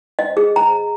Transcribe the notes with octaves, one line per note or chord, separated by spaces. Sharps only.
D#5
G#4
A#5